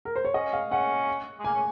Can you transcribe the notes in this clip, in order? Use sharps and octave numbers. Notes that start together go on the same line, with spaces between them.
A#4
C5
C#5
C#4 D#5
F5
C#4 F#5
G#3
A#3 G#5
C#4